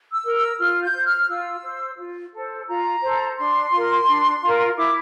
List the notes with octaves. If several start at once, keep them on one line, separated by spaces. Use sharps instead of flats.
E6
A#4
E6
F4 F6
G6
C5
F6
F4 E6
C5
F4
A4 C5
F4 A#5
A4 C5
D4 C6
F4 A#4
D4
F4 A#4
E4 D6